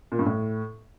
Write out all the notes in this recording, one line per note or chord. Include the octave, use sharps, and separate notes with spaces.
A#2
G2
A2